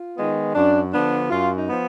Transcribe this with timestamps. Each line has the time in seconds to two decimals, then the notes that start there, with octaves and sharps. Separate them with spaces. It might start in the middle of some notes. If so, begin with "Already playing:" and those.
Already playing: F4
0.18 D#3 G#3 B3
0.55 F#2 D4
0.93 D3 F3 B3 D4
1.31 F#2 F4
1.56 D#4
1.69 F3 B3